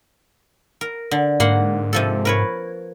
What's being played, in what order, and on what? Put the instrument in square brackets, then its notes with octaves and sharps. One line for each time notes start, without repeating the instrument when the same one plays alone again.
[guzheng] A#4
D3
[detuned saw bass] G#2 [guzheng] A#3 F#5 C6
[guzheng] C3 F3 A4
A#4 B4 C#5